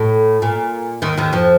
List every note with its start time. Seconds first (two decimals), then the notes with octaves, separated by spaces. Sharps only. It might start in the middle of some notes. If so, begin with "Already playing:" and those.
Already playing: A2
0.42 A#2
1.02 D#2 D#3
1.17 D#2 D#3
1.33 F2 F3